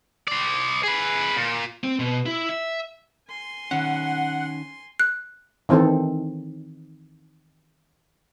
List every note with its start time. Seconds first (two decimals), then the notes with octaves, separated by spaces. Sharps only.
0.28 C5 D5
0.83 G#4 B4
1.36 A#2
1.84 C4
1.99 B2
2.26 E4
2.49 E5
3.29 G#5 C6
3.71 D#3 C#4 F#5
5.00 F#6
5.69 D#3 E3 C4 D#4 A4